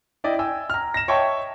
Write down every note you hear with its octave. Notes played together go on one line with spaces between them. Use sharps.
E4 D5 D#5 G5
G5 G#5 E6
A#5 F6
A#6 E7
C#5 D#5 E5 G5 A5 C#6